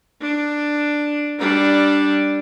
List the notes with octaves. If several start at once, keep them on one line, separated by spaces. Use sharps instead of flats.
D4
G3 D4